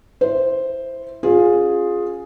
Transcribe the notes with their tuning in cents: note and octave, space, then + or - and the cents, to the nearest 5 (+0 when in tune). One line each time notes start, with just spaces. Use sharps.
E4 +0 C5 +0
C#4 +0 F4 +20 G#4 +0